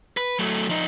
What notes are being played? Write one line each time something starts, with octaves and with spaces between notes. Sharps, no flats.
B4
F#3 A3
F3 D#4